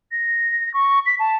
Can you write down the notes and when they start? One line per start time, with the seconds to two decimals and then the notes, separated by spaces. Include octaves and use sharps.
0.12 A#6
0.74 C#6
1.06 B6
1.19 A5